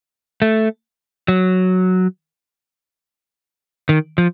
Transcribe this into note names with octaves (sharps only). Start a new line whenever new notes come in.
A3
F#3
D#3
F3